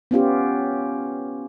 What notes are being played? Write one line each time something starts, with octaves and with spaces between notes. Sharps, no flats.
B3 C#4 F4 G4